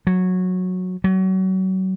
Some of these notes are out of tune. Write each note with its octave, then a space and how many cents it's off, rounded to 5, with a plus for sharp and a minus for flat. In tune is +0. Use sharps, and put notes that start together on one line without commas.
F#3 -15
F#3 +30